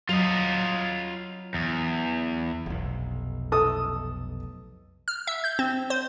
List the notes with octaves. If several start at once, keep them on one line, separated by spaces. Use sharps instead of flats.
F#3 F4 D#5
E2
F1 B1
A4 D#6
F6
E5
G6
C4
C5